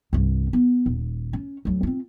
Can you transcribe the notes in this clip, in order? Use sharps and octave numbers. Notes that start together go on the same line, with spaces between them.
C2 G2
B3
D#1
C#4
D2 F#3
C4 F4